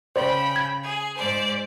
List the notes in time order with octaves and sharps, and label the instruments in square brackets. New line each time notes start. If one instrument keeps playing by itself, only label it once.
[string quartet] C#3 G5 B5 [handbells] C5 D5
[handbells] G#6
[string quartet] G#4
G#2 C5 D5